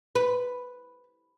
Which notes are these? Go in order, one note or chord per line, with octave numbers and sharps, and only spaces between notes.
B4